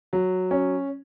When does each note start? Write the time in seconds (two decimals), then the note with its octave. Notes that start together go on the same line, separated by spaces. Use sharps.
0.13 F#3
0.51 C#4